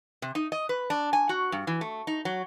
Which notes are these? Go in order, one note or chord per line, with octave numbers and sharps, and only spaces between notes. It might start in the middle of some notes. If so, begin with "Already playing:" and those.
C3
D#4
D#5
B4
D4
G#5
F#4
G2
E3
A3
D#4
F#3